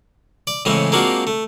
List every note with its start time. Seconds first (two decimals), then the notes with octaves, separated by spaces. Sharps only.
0.47 D5
0.65 A2 C#3 E3 G#3 C4 C#4
0.92 G#3 A#3 C4 D4 F4 F#4
1.27 A3